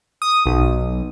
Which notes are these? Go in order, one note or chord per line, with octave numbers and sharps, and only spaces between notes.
D#6
B1